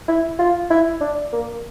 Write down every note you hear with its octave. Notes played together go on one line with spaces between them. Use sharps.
E4
F4
E4
D4
A#3